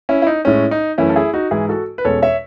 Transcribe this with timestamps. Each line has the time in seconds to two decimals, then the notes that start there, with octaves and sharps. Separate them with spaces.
0.09 C#4 E4
0.22 E4
0.27 D#4
0.45 A2 G#3 C#4
0.71 D#4
0.98 F#2 E3 A3 C#4 E4
1.10 A4
1.16 E4 G#4
1.33 D#4 F#4
1.51 G#2 E3 G#3 E4 G#4
1.69 F#4 A4
1.98 B4
2.05 E2 B2 G#3 C#4 A4 C#5
2.22 C#5 E5